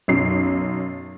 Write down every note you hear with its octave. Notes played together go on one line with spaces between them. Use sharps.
B1 F#2 C7